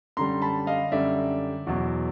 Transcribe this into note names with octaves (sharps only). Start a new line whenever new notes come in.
F#2 D3 G3 A#5 C6
A5 B5
D#5 F5
F#2 D3 G3 D5 E5
E2 B2 F#3